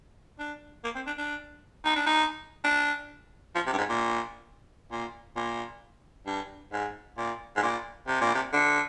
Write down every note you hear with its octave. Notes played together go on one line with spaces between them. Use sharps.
D4
A#3
C4
D4
D4
D#4
D4
D#4
D4
F3
C3
G2
G#2
A#2
A#2
A#2
G2
G#2
A#2
G#2
A#2
C3
A#2
C3
D3